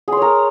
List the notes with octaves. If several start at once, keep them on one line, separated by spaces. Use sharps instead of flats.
G#4 A#4 C#5 C6